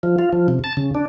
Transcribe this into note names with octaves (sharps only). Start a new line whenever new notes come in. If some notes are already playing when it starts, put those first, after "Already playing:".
F3
F4
F3
C3
A5
C#3
D4